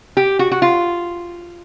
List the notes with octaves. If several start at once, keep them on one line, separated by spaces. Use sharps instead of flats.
G4
F#4
F#4
F4